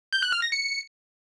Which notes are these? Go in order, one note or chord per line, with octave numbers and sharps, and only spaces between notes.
G6
F#6
F6
A#6
C#7